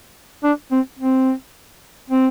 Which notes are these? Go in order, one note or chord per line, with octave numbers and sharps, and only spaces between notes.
D4
C4
C4
C4